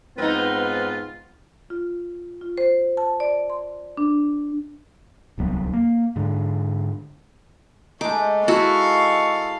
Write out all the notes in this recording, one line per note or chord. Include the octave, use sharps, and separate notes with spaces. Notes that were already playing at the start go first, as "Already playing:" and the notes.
G#2 B3 C4 D#4 F4 B4
F4
F4
C5
A5
D5
C6
D4
D1 C2 F#3 B3
A#3
G#2 D3
G#3 A3 D#4 D6
E4 F#4 A4 F5 A#5 C#6